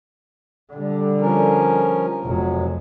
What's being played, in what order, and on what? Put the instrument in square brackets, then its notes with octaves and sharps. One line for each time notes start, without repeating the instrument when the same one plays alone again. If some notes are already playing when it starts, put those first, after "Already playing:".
[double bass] D3 G3
[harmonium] F3 C#4 A#4
[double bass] F1 [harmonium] F2 F#3